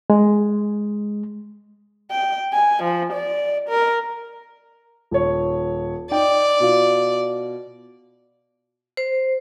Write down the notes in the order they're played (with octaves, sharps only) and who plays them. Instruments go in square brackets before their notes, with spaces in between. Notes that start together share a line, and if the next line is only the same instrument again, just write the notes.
[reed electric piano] G#3
[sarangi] G5
G#5
F3
D5
A#4
[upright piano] D#1 C#5
[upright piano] D#4 G5 [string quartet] D5
[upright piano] B2 F4
[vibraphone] C5